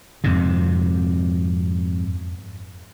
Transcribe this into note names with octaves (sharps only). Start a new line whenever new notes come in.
F2 G#2 C3